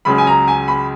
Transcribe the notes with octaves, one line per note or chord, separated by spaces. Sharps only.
C#2 C#3 F#3 B5
G#5
A#5
G#5
B5